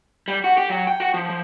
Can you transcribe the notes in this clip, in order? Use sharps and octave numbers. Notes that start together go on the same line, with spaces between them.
G3
F#4
G4
F#3
G5
F#4
F3
F3